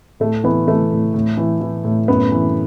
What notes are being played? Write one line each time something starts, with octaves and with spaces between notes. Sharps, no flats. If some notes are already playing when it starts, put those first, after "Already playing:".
A2 A3
E3 B3
E3 A3
A2
A2
E3
E3
A2
F#2 B3
E3